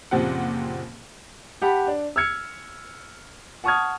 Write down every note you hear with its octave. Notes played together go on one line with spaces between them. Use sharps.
F#1 A#2 F3 C4 G4 F#5
G4 F#5 A5 B5
D4
E6 F6 G#6 C#7
F#5 A5 C#6 D#6 F6 G#6